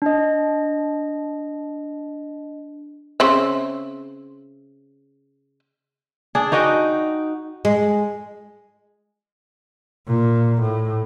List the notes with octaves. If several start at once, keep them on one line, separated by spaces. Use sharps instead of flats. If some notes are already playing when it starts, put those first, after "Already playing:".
D4 D#5
C#3 C4 E5
D4 G#4
D#4 F#4 D#5 G5
G#3
A#2
A2